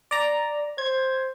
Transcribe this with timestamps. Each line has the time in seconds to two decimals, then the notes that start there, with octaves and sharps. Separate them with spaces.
0.11 D5 A#5
0.78 C5 G#6